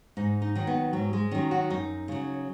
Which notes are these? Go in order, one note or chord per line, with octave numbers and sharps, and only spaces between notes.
G#2 D#4
D#4
D#3 F#3
B3
G#2 F#3
G#3
D#3 F#3 C#4
F#4
F#2 D#4
C#3 F#3